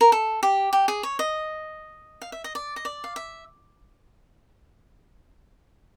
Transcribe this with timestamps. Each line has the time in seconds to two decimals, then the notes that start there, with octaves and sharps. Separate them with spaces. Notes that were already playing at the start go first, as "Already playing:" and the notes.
0.01 A#4
0.12 A4
0.43 G4
0.73 G4
0.88 G#4
1.03 C#5
1.19 D#5
2.21 F5
2.32 E5
2.44 D#5
2.55 D5
2.76 D#5
2.85 D5
3.04 F5
3.16 E5